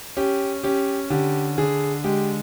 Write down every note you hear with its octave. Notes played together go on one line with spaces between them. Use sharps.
C#4 G4
C#4 G4
D3 G4
D3 G#4
G#3 G4